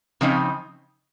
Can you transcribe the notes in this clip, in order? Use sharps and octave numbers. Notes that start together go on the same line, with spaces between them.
C#3 F3 C4 D#4